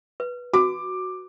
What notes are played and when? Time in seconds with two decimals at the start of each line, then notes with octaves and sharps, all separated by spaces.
0.20 B4
0.54 F#4 D6